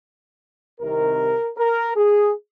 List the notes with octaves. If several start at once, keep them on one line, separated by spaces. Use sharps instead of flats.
C2 C3 D#3 A#4
A#4
G#4